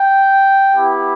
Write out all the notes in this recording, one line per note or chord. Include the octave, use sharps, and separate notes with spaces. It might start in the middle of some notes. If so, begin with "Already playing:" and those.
Already playing: G5
B3 E4 G4